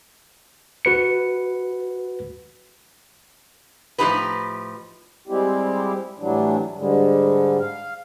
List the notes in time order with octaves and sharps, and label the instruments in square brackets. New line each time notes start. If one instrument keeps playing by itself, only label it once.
[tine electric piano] F#4 B4 C#7
[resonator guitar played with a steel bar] A2 F3 G#3 D#4 G4 B4
[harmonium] G3 G#3 C4 E4 G4
A2 E3 F#3 G3 D4
G#2 D3 G3 G#3
F5